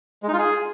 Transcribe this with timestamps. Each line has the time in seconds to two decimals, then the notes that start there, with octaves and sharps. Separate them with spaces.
0.23 G#3
0.28 D#4
0.33 F4
0.38 G#4